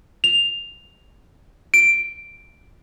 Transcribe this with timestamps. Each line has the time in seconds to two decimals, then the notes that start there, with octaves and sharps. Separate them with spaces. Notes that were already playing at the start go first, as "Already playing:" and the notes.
0.24 F7
1.74 D7